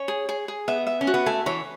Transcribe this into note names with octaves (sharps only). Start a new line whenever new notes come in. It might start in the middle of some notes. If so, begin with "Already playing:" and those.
Already playing: C#4 C#5
G#4
G#4
G#4
B3 E5
E5
C#4
F#4
B3
A3 G#5
E3 C#5